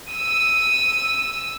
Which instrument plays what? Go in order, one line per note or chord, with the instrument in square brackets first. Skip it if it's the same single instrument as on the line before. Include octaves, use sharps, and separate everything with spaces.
[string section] E6 [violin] D#7